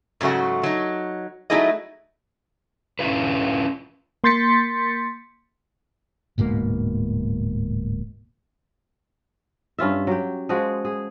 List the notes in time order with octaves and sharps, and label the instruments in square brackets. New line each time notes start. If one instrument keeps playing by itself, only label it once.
[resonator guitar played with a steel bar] G#2 C#3 F#3 A3 F#4
F#3 D#4
F#3 A3 D#4 E4 G#4 D#5
[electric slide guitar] C#4 D4 E4 F4 B4
[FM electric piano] A#3 C6 G6 A6 B6 C#7
[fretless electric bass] D1 G#2 B2 A#3
[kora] G2 C#4 F4 E5
F#3 G4
F3 G#3 F#4 G#4
G#4